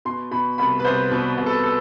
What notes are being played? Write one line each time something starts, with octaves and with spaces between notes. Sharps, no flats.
B2 C6
B2 B5
C2 B5
B4
C2 C5
B2 B4
C2
A4
A4